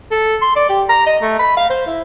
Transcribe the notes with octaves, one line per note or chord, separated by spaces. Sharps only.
A4
C6
D5
G4
A#5
D#5
A3
B5
F5
C5
E4